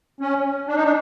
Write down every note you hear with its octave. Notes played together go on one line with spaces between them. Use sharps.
C#4
D4
D#4
D4